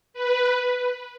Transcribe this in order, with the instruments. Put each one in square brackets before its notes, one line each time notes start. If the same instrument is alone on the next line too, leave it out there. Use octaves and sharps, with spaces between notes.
[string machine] B4